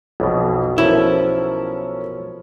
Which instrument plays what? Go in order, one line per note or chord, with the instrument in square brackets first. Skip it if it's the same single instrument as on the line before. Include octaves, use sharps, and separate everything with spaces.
[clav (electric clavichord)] B1 B2 [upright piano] F2
[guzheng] F3 B3 [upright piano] C#4 A4 A#4 [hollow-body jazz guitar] E4